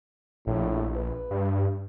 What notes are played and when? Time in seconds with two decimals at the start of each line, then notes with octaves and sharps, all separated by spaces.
0.47 A#1 A2
0.96 B4
1.31 G2